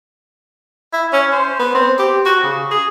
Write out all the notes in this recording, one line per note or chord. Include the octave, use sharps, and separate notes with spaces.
E4
C#4
C5
B3
C4
G4
F#4
C#3
G#4